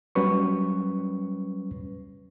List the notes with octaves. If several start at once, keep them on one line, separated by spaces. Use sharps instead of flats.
F#3 G3 C#4 B4 C#6